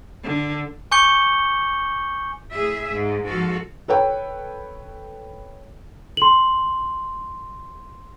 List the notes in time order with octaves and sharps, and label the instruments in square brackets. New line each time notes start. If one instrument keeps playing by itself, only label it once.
[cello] D3
[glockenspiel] G#5 C#6 D6 G6 C#7 G7
[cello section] A2 G#4 E5
G#2
G#2 F3 F#4 A4 F5
[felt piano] A4 B4 C#5 G5
[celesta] C6 F#7